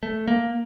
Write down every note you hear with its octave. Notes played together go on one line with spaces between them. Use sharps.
A3
A#3